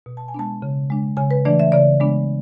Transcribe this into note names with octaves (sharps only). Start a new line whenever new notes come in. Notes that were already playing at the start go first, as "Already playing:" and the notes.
B2
A5
G#5
G#3 B3 D4 A5
C#3
G#3 D4
C#3 G#5
B4
E3 A3 D4 D5
E5
C#3 D5
G#3 B3 D4